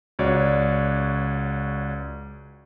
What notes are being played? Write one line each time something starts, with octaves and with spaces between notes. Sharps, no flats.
C#2 F#4 C#5 D5